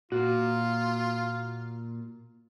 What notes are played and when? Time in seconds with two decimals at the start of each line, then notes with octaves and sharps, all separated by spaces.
0.12 A#2 F4 F#4